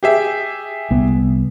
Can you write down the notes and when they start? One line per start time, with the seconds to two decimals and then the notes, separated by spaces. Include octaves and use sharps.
0.03 G4 G#4 E5
0.91 C2 B3